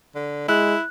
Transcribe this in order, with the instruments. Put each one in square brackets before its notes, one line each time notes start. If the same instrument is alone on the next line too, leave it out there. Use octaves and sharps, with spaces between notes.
[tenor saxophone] D3
[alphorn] G#3 [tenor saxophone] E4 [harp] F#6